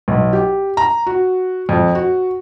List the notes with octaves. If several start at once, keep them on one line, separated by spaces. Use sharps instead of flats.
B1
G4
A#5
F#4
F2
F#4